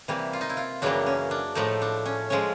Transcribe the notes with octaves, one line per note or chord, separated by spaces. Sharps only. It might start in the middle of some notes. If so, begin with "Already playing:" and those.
C3 E3 G3 A#3
F4
D#4
E4
F4
F#2 C#3 E3 G3 A#3 D4
C#4
D4
A2 F3 A3 D#4
D4
C#4
F3 G#3 C#4